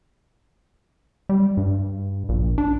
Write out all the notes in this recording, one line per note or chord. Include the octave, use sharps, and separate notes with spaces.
G3
G2
A#1
D4